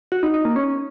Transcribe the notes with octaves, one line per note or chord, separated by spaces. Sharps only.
F#4
D#4
D#4
A#3
C#4